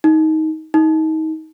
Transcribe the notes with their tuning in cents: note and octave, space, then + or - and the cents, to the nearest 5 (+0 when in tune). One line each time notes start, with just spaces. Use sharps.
D#4 +20
D#4 +30